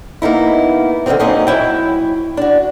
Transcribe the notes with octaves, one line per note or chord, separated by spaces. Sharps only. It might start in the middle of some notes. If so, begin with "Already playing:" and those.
A#3 B3 D#4 E4
D3 D#3 F#3 G#3 C4
F#3 A#3 C4 C#4 D#4 D#5
F#3 E4 G5
D4 F#4